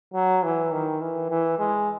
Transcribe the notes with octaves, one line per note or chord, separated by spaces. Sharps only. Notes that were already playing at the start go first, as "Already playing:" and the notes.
F#3
E3
D#3
E3
E3
G#3